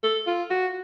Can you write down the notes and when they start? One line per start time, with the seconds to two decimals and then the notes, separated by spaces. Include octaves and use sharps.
0.03 A4
0.27 F4
0.50 F#4